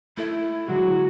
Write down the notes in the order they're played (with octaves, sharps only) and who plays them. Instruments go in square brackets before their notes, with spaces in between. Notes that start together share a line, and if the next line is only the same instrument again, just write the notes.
[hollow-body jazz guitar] A3 A4 E5 [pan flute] E4
[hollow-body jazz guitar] D3 F#3 G#3 [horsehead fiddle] F#4